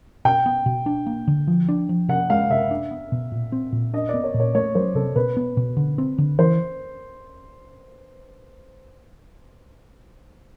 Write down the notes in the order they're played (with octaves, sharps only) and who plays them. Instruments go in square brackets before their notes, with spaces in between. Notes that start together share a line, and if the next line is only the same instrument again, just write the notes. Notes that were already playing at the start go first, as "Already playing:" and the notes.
[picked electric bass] B2 [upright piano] G5
[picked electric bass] B3
B2
D4
A#3
D3
F3
D4
F3
[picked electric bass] C3 [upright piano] F#5
[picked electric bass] G#3 [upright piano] F5
[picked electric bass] C3 [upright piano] E5
[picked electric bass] D4
B3
B2
A#2
C4
A#2
[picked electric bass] D4 [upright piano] D#5
[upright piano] D5
[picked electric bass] B3
[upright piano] C#5
[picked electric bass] A#2
[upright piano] C#5
[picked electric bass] A3 [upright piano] C#5
[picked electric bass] F#3 [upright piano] C5
[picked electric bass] C3 [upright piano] A4
[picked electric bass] B2 [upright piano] B4
[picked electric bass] B3
B2
D3
C4
D3
[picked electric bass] E3 [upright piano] C5